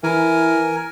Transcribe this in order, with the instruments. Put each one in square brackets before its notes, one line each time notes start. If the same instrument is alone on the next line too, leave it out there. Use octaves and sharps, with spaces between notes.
[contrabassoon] E3 [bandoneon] A#4 G#5